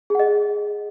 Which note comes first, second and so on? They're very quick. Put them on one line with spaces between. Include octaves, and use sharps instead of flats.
G#4 F#5 D#5